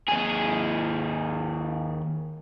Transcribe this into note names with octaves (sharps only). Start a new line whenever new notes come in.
D#2 G#4